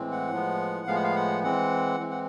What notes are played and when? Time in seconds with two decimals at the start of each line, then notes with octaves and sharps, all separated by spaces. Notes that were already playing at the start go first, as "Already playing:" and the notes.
Already playing: A2 E3 G#3 C4
0.12 F#5
0.31 A2 F3 G#3 B3
0.87 A2 F3 G#3 B3 F5
0.95 F#5
1.03 F5
1.16 F#5
1.43 E3 G#3 C4 F#5
2.00 E3 G#3 C4
2.11 F#5